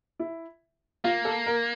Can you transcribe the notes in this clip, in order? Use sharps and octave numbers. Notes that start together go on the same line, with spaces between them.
E4
A#3 F4
A4
A#4